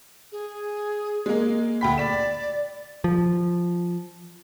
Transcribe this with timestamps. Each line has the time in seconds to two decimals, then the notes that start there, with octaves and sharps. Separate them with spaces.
0.32 G#4
1.26 G#3 A#3
1.81 D2 G5 B5 B6
1.98 D5 B6 E7
3.04 F3